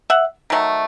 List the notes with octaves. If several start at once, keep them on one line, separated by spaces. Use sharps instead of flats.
E5 F#5
D#3 F#3 A3